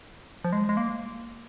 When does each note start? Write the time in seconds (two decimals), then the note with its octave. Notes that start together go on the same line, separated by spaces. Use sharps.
0.44 F3
0.53 G#3
0.69 G#3
0.77 A#3